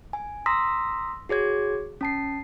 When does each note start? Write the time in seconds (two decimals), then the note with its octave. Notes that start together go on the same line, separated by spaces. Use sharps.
0.13 G#5
0.46 A#5 C6 D#6 E6 A#6 B6
1.29 F#4 G#4 C#5 G#6
2.01 C#4 A5 C7